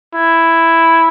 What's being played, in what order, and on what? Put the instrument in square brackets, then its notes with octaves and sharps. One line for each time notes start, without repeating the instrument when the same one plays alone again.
[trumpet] E4